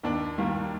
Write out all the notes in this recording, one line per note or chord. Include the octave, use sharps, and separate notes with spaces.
D#2 D4
D#3 G3 A#3